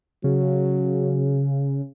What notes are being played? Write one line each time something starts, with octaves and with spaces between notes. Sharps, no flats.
C#3 F#3